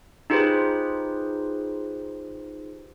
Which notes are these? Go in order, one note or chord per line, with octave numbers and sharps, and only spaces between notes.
D#4 F4 G4 G#4 B4 C5